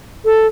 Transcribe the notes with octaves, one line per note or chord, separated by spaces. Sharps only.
A4